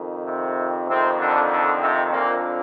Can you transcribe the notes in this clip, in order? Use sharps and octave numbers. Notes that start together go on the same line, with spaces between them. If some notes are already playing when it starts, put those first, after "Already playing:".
Already playing: F2 D#3
C3 C4
F2 C3 D#3 C4
D3 D4
D3 D4
C3 C4
F2 A#2 D3 F3 A#3